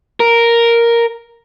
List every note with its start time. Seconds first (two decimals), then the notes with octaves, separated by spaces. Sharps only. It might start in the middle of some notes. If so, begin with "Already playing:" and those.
0.20 A#4